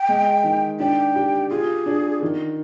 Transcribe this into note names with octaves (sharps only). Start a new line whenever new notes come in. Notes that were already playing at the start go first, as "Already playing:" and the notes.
Already playing: G5
G#3
D#3
D4 G5
G4
F4 G#4
D4
D#3